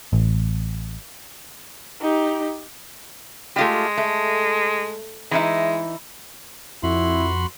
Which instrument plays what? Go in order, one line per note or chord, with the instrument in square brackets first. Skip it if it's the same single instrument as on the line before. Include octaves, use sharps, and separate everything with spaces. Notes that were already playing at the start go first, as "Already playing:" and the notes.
[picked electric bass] A1
[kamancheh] D#4 G4
[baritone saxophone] G#3 [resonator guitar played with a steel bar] A3 F4 G4
[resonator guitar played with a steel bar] A3
[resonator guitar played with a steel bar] E3 D#4 E4 [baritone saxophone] G#3
[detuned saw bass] F2 [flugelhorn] E4 [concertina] F#4 B5 C6